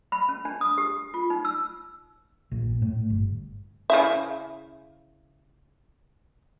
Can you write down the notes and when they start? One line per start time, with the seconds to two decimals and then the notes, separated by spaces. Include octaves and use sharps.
0.12 B5
0.29 C#4
0.45 D4
0.61 D#6
0.78 G4
1.14 F4
1.30 D#4
1.45 E6
2.52 A#1
2.65 A#2
2.82 A2
3.10 G1
3.90 C#3 E4 E5